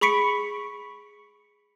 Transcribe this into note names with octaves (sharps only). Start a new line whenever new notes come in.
G#4 B5 C#6 B6 C#7 D7